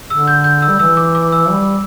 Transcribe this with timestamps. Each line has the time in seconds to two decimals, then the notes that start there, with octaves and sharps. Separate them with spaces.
0.10 D3 E6
0.28 G6
0.44 G6
0.62 E6
0.69 G3
0.79 E3 E6
0.97 D6
1.15 D6
1.32 E6
1.50 G3